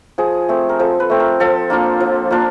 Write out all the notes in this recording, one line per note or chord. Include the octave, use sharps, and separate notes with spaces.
F3 G#4
A3 C4
A#4
F3 A4
B4
A3 C4
A#4
F3 A4
A#3 D4 F4
F3
A#3 D4 F4